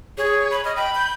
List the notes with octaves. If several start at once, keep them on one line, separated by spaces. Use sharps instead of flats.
G#4 C#5
B5
D#5 F6
G5 B5
G6